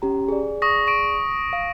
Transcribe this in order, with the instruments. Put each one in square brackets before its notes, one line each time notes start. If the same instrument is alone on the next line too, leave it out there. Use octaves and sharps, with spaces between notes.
[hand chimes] C#4 G4 A#5
G#4 D5
[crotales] C#6 D#6 A#6
C#6 D7
[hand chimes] F5